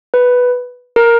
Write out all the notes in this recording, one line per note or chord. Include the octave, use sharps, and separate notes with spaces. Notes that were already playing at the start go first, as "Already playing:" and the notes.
B4
A#4